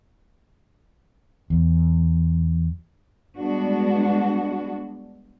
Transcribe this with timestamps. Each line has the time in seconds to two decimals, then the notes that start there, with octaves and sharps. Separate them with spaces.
1.50 E2
3.37 G3 G#3 B3 D4 F#4